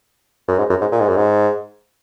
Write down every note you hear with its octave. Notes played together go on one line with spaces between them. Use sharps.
F#2
G#2
F#2
G#2
A#2
G#2
F#2
G#2